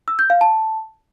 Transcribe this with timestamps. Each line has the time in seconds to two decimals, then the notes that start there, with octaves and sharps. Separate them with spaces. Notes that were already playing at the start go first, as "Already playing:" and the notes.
0.08 E6
0.19 G6
0.30 F5
0.41 A5